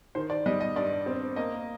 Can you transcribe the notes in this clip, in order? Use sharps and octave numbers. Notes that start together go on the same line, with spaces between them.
D#3 C5
D5
G3 D#5
D#5
G2 D5
C4
A#3 D#5